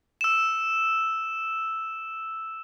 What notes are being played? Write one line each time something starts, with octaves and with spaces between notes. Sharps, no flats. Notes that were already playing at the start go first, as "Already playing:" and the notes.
E6 E7